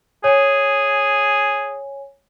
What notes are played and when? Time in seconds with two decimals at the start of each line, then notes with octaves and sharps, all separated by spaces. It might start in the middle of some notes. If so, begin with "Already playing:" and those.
0.24 G#4 C#5 G#5